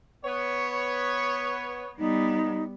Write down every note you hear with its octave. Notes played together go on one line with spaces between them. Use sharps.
B3 C#5
G3 B3 D#4